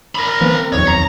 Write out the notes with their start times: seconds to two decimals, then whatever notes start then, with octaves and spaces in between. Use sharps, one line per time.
0.15 A#4 B5
0.41 E3 A#3 B3
0.54 C4
0.73 D#1 B1 F2 C#5
0.87 A#5